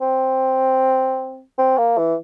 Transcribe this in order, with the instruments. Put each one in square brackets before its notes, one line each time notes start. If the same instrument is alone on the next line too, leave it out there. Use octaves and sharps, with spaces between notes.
[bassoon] C4
C4
A#3
E3